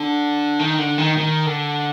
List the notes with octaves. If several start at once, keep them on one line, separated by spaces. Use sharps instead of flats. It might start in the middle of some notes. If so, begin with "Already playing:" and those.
Already playing: D3
D#3
D3
D#3
D#3
D3